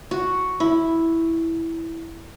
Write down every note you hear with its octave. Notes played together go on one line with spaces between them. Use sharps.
F#4
E4